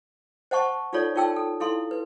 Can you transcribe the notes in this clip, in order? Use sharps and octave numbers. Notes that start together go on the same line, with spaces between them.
C5 D#5 F#5 A5 C#6
D#4 F4 A4 C#5 D5
D#4 F4 A#4 G5 A5 E6
A4
E4 A4 F5 C6
B4